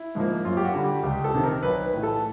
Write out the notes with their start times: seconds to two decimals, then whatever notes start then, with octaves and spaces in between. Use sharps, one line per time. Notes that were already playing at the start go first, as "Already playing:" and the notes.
Already playing: E4
0.15 G#2 F3 A#3
0.45 F#2 F4
0.57 G4
0.64 F#4
0.74 D3 G3
0.84 G4
1.03 C#2 G4
1.24 A4
1.34 C3 D#3
1.44 A#4
1.63 B1 B4
1.83 B4
1.93 A2 E3
2.03 A4